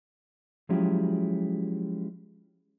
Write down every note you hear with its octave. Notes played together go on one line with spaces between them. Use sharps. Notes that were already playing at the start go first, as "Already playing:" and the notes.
F3 F#3 G#3 C#4 E4 G4